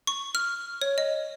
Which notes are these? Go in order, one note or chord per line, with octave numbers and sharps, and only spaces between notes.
C#6
F6
C#5
D#5